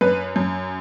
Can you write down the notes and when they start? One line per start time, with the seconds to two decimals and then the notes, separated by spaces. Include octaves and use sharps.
0.01 F#2 B4
0.36 F#2